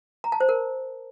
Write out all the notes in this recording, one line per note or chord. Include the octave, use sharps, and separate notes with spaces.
A#5
A5
C5
A#4